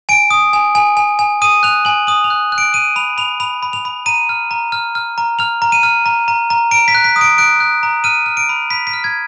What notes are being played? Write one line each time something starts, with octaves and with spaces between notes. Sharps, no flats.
G#5 D7
D#6
G#5
G#5
G#5
G#5
D#6 D#7
F#6 F7
G#5 F#7
D#6 F#7
F7
F#6
F#6
D7
F#6 D#7
B5 F7
B5 F7
B5 F7
B5
F7
B5
A#5 D#7
F6
A#5
F6
F6
A#5
F6 F7
A#5
D#7
F6
A#5
A#5
A#5
A#5 D7
B6
F#6
B6
D#6
D7
F#6 D7
F#6
A#5
F6 D#7
F6
D7
B5
B5 B6
B6
F6
G#6